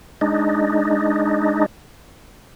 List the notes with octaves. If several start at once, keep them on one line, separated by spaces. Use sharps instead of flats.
G#3 D4 D#4